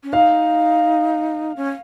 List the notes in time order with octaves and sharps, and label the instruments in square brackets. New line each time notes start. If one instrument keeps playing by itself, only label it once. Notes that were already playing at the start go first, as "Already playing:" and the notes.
[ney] C#4
[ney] D#4 [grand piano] F5
[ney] C#4